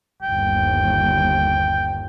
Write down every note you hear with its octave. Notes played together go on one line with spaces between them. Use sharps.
G1 D#2 G5